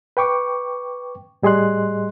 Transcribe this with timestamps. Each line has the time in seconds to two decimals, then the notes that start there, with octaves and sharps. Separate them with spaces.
0.17 B4 G5 C#6 D6
1.43 A2 G3 G#4 D#5 C6 F#6